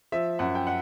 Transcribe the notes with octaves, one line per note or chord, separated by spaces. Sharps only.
F3 E5
F#2 F#5
G5
F#5